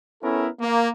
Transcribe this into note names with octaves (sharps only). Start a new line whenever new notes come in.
B3 C#4 E4 A4 A#4
A#3